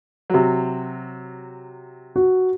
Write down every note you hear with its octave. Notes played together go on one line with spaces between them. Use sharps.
C3 F#3
F#4